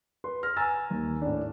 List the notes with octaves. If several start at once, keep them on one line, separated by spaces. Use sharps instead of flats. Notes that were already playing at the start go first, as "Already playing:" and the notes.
B4 C6
F6 A#6
G#5 A#5 E6 A6
D#2
A2 D4